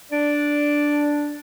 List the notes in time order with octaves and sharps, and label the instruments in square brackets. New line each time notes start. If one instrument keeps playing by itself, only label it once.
[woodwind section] D4 [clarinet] D5